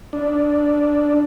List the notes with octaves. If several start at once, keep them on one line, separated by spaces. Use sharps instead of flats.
D4